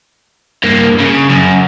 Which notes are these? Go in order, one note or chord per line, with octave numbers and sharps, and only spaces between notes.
G2 A#3
C#3
F#2